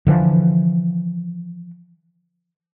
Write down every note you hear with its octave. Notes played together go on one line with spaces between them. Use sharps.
D3 E3 F3